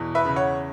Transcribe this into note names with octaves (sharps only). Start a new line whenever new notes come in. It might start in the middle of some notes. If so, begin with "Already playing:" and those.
Already playing: E2 B2
B4 E5
C#3
C#5 F#5